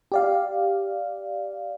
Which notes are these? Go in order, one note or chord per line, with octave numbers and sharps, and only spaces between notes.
G4 D5 F5